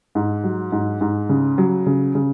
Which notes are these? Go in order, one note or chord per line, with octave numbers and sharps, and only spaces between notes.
G#2
F#3
G#2
G#2
C#3
F#3
C#3
C#3